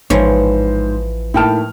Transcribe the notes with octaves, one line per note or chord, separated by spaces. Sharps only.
A1 G#2 E3 F3 C5 C#5
A2 A#3 D#4 G5 A5 F6